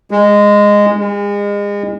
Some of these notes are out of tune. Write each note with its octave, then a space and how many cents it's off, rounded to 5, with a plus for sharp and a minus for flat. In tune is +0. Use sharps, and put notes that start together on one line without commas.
G#3 -10
G#3 -35